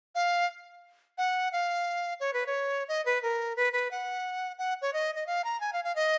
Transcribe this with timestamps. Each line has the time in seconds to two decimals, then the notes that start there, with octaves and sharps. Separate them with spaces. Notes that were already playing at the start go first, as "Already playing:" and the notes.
0.15 F5
1.18 F#5
1.52 F5
2.20 C#5
2.33 B4
2.46 C#5
2.88 D#5
3.06 B4
3.23 A#4
3.56 B4
3.73 B4
3.91 F#5
4.59 F#5
4.82 C#5
4.93 D#5
5.15 D#5
5.27 F5
5.44 A#5
5.60 G#5
5.73 F5
5.84 F5
5.96 D#5